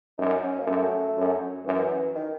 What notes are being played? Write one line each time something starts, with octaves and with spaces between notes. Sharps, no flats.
F#2 D#4
C#4
A#3
F#2 A3
F#2
F#2 E3
D#3